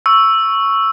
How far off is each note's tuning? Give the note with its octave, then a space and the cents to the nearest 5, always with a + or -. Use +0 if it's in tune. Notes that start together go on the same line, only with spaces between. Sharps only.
C#6 +0 E6 +0